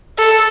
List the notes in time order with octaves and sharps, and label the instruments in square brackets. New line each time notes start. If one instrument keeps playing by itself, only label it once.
[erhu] A4